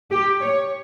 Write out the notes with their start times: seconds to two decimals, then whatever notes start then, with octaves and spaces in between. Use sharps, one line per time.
0.11 G4
0.42 C#5